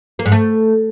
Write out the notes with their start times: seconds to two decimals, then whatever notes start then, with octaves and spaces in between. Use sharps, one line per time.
0.19 A#3
0.26 G#2
0.32 A3